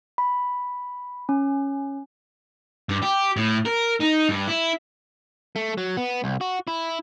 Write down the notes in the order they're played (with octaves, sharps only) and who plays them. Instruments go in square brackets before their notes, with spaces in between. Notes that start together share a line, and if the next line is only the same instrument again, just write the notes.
[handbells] B5
C#4
[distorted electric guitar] G2
G4
A2
A#4
D#4
G2
E4
[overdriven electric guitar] A3
F#3
B3
C2
F#4
E4